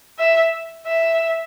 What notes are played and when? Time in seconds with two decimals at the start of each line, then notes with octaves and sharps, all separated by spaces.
0.19 E5
0.86 E5